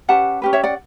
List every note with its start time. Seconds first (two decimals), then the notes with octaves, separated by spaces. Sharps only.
0.08 C#4 G4 B4 F#5 A5
0.42 C#4 G4 B4
0.53 C#5 E5
0.64 D5 F#5